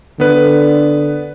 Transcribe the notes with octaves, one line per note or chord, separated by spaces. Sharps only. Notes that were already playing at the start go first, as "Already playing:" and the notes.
D3 B3 B4